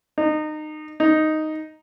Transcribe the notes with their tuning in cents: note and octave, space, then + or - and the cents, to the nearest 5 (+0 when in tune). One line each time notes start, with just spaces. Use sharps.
D#4 -25
D#4 +0